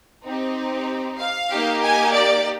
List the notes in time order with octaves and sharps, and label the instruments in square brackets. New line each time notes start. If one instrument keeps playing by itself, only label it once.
[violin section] C4 D#4 G4
F5
A#3 D#4 G4
G#5
D5